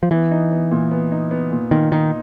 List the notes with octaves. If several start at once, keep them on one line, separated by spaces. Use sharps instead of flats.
F3
E3 B3
D#4
B3
A#2
B3
D#4
B3
A#2
A#2 D#3
D#3 D#4